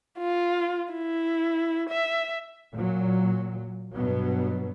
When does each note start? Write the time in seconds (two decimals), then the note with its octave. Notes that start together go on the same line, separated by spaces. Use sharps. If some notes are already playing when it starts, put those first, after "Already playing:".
0.18 F4
0.93 E4
1.89 E5
2.72 A#2 F#3
3.93 G2 B2 F#3 B3